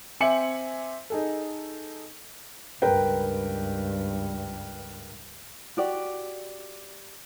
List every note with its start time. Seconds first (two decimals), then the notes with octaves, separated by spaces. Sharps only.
0.20 C4 E5 G#5 D6 C#7 F#7
1.10 D#4 G#4 A4
2.82 C#2 G2 A#4 B4 G5
5.77 F#4 G4 D5